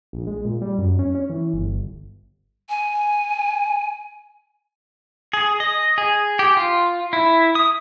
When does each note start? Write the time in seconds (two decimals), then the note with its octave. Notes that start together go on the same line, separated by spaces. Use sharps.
0.13 A#1
0.27 G#3
0.45 A#2
0.62 G3
0.78 F#2
0.99 C#4
1.15 C#4
1.30 E3
1.54 G1
2.69 G#5
5.33 G#4
5.60 D#5
5.98 G#4
6.39 G4
6.57 F4
7.13 E4
7.55 D#6